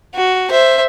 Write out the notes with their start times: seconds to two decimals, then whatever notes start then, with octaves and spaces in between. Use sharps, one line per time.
0.16 F#4
0.51 C5 E5